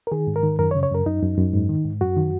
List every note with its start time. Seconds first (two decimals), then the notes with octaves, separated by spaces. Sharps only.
0.07 A#4
0.12 D#3 G#4
0.27 G#2
0.36 A#4
0.43 D#3
0.59 F#2 A#4
0.71 C#5
0.75 C#3
0.83 C#5
0.91 F#2 A#4
1.06 F#2 D#4
1.22 F#2
1.38 F#2
1.54 G#2
1.69 D#3
1.85 G#2
2.01 F#2 F#4
2.17 D#3